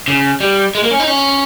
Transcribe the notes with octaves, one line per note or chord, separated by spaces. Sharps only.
C#3
G3
G#3
A#3
C#4
D#4
C#4